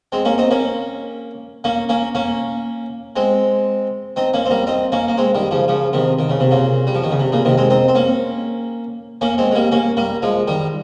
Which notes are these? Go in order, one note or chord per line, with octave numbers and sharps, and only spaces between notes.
G#3 C4
A#3 C#4
C4 D#4
A#3 C#4
A#3 C#4
A#3 C#4
A#3 C#4
G#3 C4
C4 D#4
A#3 C#4
C4
G3 A#3
C4 D#4
A#3 C#4
A#3
G#3 C4
D#3 G3
C#3 F3
C#3 F3
C3 D#3
D#3
C#3
C3
A#2 C#3
G3
F3
D#3
C#3
C3
A#2 C#3
C3 D#3
G#3 C4
C4 D#4
C4
A#3 C#4
A#3 C#4
G#3 C4
G#3
G3 A#3
A#3 C#4
G3 A#3
F3 G#3
D#3 G3